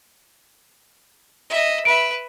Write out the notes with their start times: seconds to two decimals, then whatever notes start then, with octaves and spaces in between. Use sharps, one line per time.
1.50 D#5 E5
1.85 B4 E5 D7